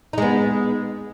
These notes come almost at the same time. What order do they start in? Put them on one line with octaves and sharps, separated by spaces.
D#4 G#3 B3